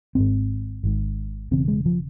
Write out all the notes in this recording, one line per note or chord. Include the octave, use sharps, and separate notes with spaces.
G#1 G#2 C4
G#1 G#2
E1 E2 C#3 C4
G#3
F3